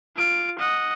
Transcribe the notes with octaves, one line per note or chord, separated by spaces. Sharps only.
F4 D7
D#5 F#5